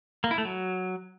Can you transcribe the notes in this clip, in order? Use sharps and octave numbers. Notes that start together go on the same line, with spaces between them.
A#3
E4
A3
F#3